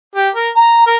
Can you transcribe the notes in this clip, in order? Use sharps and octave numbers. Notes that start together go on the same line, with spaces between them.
G4
A#4
A#5
A#4